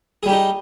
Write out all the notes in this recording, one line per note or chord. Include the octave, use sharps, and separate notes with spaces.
G3 D#4 G4 G#4